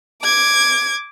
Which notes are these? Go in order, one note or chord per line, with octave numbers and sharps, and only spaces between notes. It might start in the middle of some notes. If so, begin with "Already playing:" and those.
D6 G#6